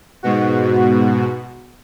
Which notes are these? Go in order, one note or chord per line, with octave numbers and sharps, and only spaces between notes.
G#2 B2 F#4